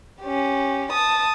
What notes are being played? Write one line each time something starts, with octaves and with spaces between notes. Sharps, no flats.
C#4 G4
A5 D#6